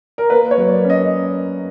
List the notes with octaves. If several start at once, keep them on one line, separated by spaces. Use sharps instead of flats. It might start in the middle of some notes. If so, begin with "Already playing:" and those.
A#4
A#3 B4
C#5
F#3
D5
C#4
D#5